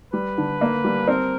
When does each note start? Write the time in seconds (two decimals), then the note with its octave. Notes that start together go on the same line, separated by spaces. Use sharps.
0.13 G3 B4
0.38 D3
0.61 A#3
0.84 G3
1.07 C4 A#4